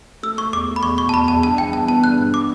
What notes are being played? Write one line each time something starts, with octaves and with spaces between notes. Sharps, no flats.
A3 E6
A3 C#6
E2 D6
A3
B5
E2 C#6
B2 C#6
A5
E2 B5
E2 A5
G2 A5
E3 G5
E3 A5
B3 A5
G2 F#6
G2
D6